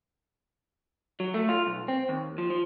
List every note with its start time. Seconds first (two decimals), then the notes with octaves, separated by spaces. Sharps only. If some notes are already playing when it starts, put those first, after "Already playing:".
1.20 F#3
1.34 A3
1.49 F4
1.67 B1
1.88 C4
2.09 D#2
2.38 F3
2.50 F3